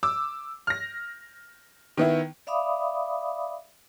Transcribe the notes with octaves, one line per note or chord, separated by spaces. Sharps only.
D6 E6
F6 A#6
D#3 B3 E4
D5 E5 F5 B5 D6 D#6